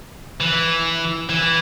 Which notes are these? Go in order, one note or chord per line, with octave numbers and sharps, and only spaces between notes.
E3
E3